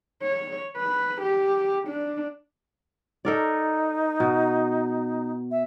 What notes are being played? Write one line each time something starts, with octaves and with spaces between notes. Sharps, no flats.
C#5
B4
G4
D4
D#4 A4 A#4 D5
B2
E5